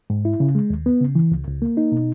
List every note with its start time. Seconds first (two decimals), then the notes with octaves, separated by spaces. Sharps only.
0.10 G#2
0.25 E4
0.40 C#3
0.55 G#3
0.70 D#2
0.86 B3
1.01 C#3
1.15 E3
1.32 C#2
1.47 C#2
1.62 A#3
1.77 D#4
1.92 B2